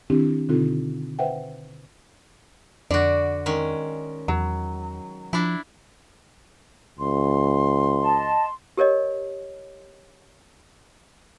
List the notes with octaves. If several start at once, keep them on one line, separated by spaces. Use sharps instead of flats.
D#3 C4 D4 E4 G4
B2 D3 C4 D#4 F4 A4
B4 C5 E5 F#5 G5
F2 D3 F#4 D5
D#3 G#3 C#4
E2 F#3
F3 D4 E4
C#2 C6
D#5 A5
G4 A#4 C#5 D#5